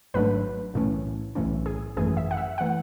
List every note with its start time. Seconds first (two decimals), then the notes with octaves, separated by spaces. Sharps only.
0.14 G#1 G#2 F#3 A3 D4 B4
0.74 B1 A2 E3 A3 C#4
1.35 B1 A2 E3 A3 C#4
1.66 G#4
1.97 G#1 F#2 E3 A3 G#4
2.17 E5
2.31 F#5
2.37 E5
2.58 E3 A3 F#5